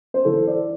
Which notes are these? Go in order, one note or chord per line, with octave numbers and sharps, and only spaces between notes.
C5
E3 A4
D5